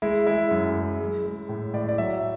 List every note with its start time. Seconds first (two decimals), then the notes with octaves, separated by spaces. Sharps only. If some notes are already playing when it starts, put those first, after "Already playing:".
0.02 G#3 E4
0.27 G#3 E4
0.51 F#2
0.76 G#3
1.00 G#3
1.25 G#3
1.49 A2
1.73 A2 D5
1.89 D5
1.98 F#3 E5